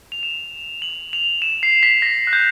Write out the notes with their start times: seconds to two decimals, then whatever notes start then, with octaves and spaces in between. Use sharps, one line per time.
0.12 F7
0.23 E7
0.82 F#7
1.13 F7
1.42 E7
1.63 C7
1.83 B6
2.02 A#6
2.27 F#6
2.33 G6